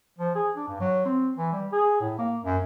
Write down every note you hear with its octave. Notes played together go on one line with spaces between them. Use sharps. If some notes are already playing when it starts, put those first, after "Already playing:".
F3
G#4
D4
G2
F#3
C4
E3
G3
G#4
A2
A#3
F#2